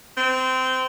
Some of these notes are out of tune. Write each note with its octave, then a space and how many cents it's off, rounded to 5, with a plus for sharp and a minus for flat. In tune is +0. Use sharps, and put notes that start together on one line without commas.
C4 -20